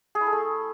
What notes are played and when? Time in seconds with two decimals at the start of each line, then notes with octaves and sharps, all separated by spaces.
0.15 G#4
0.21 E4
0.27 A4
0.33 A3